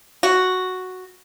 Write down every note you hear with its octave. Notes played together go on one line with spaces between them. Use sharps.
F#4